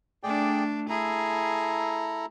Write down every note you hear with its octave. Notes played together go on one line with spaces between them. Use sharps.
A3 D4 G#4 D5 G5
E4 G#4 A4 A#5